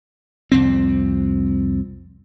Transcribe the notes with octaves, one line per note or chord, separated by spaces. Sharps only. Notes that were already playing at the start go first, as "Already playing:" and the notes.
C2 F2 C4